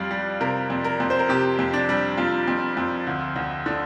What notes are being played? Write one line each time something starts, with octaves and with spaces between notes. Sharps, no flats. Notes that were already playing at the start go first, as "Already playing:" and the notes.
Already playing: F2 G3 D5 F5
G3
C3 A#4
F2
A#4
F2
C5
A#4
C3 G4
F2
D4
G3
F2 F4
F2
F2
D2
D2
D3